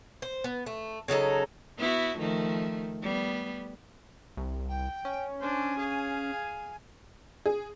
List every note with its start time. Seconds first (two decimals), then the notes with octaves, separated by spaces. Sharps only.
0.22 C5
0.44 B3
0.66 A3
1.08 C#3 F#3 D#4 A4
1.78 B3 E4 F#4
2.18 D#3 F3 A3
3.02 G3 B3
4.37 C2
4.68 G5
5.05 C#4
5.40 D4 C5 G#5
5.78 G#4 F5
6.31 G#5
7.46 G#4